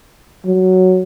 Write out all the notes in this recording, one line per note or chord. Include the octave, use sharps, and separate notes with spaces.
F#3